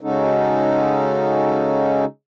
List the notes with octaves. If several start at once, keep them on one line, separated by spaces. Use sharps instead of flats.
C#3 G#3 C#4 D#4 F#4 A4